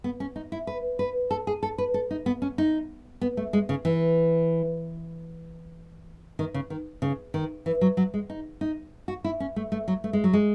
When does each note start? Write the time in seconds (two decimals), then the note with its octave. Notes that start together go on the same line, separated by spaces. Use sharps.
0.04 B3
0.20 C#4
0.36 D#4
0.52 E4
0.67 B4
0.99 B4
1.31 A4
1.47 G#4
1.63 A4
1.78 B4
1.94 A4
2.11 D#4
2.26 B3
2.42 C#4
2.58 D#4
3.21 B3
3.37 A3
3.53 G#3
3.69 C#3
3.85 E3
6.39 D#3
6.54 C#3
6.70 D#3
7.02 C#3
7.34 D#3
7.66 E3
7.81 F#3
7.97 F#3
8.14 G#3
8.30 D#4
8.61 D#4
9.08 F#4
9.24 E4
9.40 C#4
9.56 A3
9.72 A3
9.88 F#3
10.04 A3
10.13 G#3
10.24 F#3
10.33 G#3